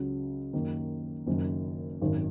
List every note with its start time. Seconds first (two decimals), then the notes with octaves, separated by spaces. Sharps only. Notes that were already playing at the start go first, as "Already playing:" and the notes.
Already playing: C#2 C#3 F#3
0.53 F#2 D#3 A#3
1.26 F#1 F#2 D#3 A#3
2.02 G#1 F#2 D#3